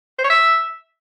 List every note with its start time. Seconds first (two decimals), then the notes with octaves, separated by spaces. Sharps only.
0.19 C5
0.24 C#5
0.30 E5